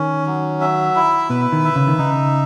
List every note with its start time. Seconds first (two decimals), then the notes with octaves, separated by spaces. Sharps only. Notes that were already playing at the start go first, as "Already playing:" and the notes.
Already playing: D#3 C#4
0.26 F#3
0.61 E5
0.96 E4
1.30 B2 B4
1.52 D#3
1.64 E5
1.76 C#3
1.88 D#3
1.98 C#3 D#4